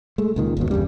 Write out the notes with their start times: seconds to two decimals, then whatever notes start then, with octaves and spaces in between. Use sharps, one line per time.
0.18 G#3 A3
0.36 C#2 A#2 D#3
0.57 G1 D#2 B2
0.71 E2 G2 C#3 G3